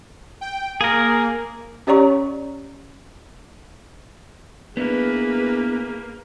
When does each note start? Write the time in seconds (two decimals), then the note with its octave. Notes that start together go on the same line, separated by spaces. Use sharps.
0.41 G5
0.81 A#3 G#4 A#4
1.87 C#4 G4 C#5 D5 A#5 C#6
4.77 A#3 B3 D4 E4 G#4 B4